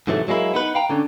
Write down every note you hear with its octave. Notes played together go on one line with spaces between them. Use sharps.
G#2 C3 E3 F#3 G3 A3
F#3 G#3 A#3 E4
B3 D#4 B4
F5 G5 A#5
D3 C#4 D4